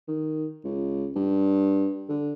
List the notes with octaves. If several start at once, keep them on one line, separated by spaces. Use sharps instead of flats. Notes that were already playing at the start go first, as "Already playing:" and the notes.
D#3
C#2
G2
D3